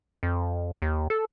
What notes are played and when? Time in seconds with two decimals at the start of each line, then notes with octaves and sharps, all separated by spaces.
0.23 F2
0.82 D#2
1.10 A4